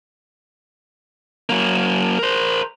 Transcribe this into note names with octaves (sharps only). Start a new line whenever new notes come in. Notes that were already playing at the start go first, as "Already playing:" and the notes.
F#3 A#3
A#4 C5